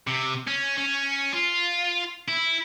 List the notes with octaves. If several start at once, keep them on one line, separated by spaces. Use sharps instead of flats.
C3
C#4
C#4
F4
E4